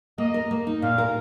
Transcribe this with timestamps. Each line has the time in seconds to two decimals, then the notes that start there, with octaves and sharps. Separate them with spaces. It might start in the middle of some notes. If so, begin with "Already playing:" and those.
0.18 A#3 D#5
0.34 A#4
0.51 A#3
0.67 D#4
0.82 A#2 F5
0.98 A#4